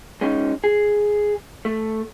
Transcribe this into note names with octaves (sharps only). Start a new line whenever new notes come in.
G#3 C#4 D#4
G#4
A3